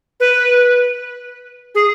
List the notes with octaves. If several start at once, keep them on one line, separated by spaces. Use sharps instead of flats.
B4
G#4